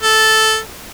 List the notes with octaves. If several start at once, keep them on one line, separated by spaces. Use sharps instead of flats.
A4